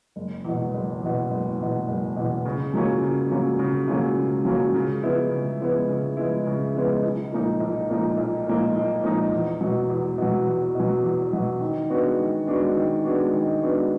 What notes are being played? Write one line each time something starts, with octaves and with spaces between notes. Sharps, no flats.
F#1
E2 B2
F#1
E2 B2
F#1
E2 B2
F#1
E2 B2
C#3
F#3 A#3 C#4 F4
C#3
F#3 A#3 C#4 F4
C#3
F#3 A#3 C#4 F4
C#3
F#3 A#3 C#4 F4
C#3
F3 G#3 B3 E4
C#3
F3 G#3 B3 E4
C#3
F3 G#3 B3 E4
C#3
F3 G#3 B3 E4
B1
A#2 F3 A#3 D#4
B1
A#2 F3 A#3 D#4
B1
A#2 F3 A#3 D#4
B1
A#2 F3 A#3 D#4
E2
B2 F#3
E2
B2 F#3
E2
B2 F#3
E2
B2 F#3
D#3
G#3 B3 D4 F#4
D#3
G#3 B3 D4 F#4
D#3
G#3 B3 D4 F#4
D#3
G#3 B3 D4 F#4